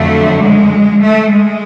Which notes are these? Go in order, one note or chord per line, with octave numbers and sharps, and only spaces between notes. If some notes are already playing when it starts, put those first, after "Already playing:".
Already playing: F2 D3 F#3 A3
G#3
A3
G#3